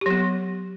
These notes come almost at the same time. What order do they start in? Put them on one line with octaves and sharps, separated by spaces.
G4 F#3 B3